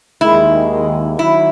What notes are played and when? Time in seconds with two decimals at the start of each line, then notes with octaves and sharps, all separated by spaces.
0.21 D#2 D#3 G#3 E4
1.19 D#3 F#3 E4